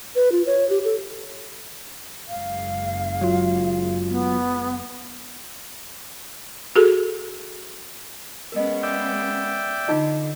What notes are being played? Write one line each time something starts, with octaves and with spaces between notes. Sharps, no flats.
B4
F4
C#5
G4
A4
F#1 G#3 F5
F#3 F4
B3
F#4 G#4 A4
G#3 B3 C#4 A#4 D#5
D5 E5 G5
D3 D#4 F4 D#5